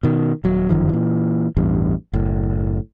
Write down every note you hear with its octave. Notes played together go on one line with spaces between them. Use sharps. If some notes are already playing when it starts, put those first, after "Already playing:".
B2 D#3
D#1 F#3
G1 F#2 D#3 F3
A#2 E3
A1 E2 G2
F#1 A2